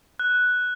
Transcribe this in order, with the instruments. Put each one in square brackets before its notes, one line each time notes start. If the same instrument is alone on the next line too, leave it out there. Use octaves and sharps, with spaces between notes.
[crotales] F#6